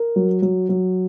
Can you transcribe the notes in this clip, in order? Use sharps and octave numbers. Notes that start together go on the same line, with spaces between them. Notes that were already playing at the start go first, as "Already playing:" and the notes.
Already playing: A#4
F#3
F#3
F#3